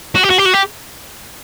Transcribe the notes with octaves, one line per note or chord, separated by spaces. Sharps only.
F#4
G4
F#4
G4
F#4
G4